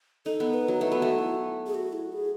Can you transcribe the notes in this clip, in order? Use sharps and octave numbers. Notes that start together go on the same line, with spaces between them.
D#4 A4
B3
B4
F#3
A3 E4
B3
A3 F#4
E4
G#4
F#4
E4
G#4